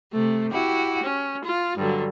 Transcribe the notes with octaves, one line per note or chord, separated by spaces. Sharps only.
C3 A3
E4 F#4 G4
C#4
F4
G2 D3 F#3